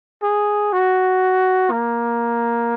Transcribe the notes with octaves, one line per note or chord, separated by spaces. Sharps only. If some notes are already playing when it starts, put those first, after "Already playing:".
G#4
F#4
A#3